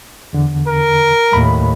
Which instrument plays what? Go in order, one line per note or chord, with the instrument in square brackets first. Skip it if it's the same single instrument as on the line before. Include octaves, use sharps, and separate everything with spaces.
[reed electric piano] E2 D3
[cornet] A#4
[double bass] D#2 A2 [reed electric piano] B5